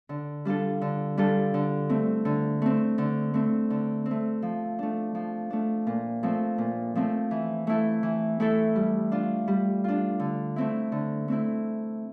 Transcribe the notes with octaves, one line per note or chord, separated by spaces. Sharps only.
D3
G3 D4 F4 A4
D3
G3 D4 F4 A4
D3
A3 C4
D3
A3 C4
D3
A3 C4
D3
C4
A3
F3
A3 D4
F3
A3 D4
A#2
F3 A3 C4
A#2
F3 A3 C4
E3
A3 E4 A4
E3
A3 E4 A4
G3
D4 F4
G3
D4 F4
D3
A3 C4 E4
D3
A3 C4 E4